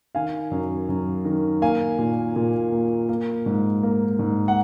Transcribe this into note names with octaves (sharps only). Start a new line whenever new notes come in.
D#3 F5 G#5
F#2
F#2
D#3
A#3 F5 G#5
A#2
A#2
A#3
A#3
G#2
A#3
G#2
F#5